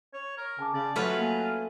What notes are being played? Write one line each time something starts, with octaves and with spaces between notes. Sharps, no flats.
C#5
A#4
C#3 G#5 A5 D6
C#3 D5 A6
F#3 A3 C#4 F4 B4
A#3 G#5